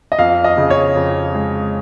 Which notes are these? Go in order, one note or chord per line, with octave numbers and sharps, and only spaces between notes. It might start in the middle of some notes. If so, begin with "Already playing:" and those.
D#5
F2 F5
D#5
C#3
C#5
F2
G#3